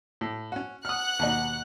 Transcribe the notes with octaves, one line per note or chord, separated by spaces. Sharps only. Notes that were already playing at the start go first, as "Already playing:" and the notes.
A2
C#4 F#4
F#5 D#6 F6 F#6
D#2 B2 D#4